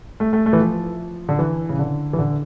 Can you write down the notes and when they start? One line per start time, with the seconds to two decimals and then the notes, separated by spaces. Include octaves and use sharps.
0.20 A3
0.33 A3
0.46 A3
0.53 E3
0.59 F3
1.29 D3
1.39 E3
1.69 C#3
1.79 D3
2.13 E3
2.19 D3